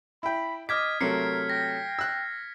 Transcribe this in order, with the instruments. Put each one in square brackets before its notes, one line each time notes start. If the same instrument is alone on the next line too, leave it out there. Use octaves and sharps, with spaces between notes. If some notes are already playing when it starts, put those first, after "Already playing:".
[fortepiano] E4 G5 [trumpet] B5
[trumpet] D#5 [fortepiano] D6 [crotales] F6 G#6 B6
[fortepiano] C3 F#3 A3 [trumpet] A#4 [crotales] C7 C#7
[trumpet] G5 [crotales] A#6
[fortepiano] E6 F#6